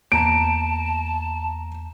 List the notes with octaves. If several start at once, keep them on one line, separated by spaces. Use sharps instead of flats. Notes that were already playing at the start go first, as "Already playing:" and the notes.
E2 A#3 A5 A#5 D7